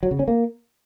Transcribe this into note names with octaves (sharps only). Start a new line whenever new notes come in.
F#3
C#3
C#4
A#3